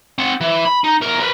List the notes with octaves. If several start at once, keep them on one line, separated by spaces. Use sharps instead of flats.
C4 F#5
E3
B5
D#4
E2 A#4
A#4 B4